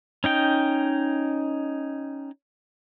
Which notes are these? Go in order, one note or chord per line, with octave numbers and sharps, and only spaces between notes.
C#4 D#4 G5